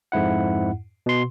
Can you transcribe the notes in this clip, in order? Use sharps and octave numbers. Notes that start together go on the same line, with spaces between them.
F2 G#2 E4 F#5
B2 C6